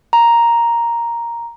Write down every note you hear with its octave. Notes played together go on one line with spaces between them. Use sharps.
A#5